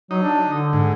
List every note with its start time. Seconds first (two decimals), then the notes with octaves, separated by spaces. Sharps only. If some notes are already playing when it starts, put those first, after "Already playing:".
0.11 F#3 D#4
0.23 D4
0.47 D3
0.73 G#2